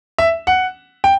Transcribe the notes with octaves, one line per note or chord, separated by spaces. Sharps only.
E5
F#5
G5